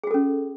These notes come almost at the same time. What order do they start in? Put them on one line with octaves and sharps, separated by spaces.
G#4 F#4 A4 C#4